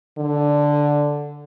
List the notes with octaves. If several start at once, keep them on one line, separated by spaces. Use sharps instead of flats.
D3